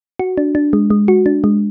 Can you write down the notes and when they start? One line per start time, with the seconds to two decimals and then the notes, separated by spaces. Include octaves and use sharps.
0.19 F#4
0.38 D4
0.55 D4
0.73 G#3
0.90 G#3
1.08 F#4
1.26 D4
1.44 G#3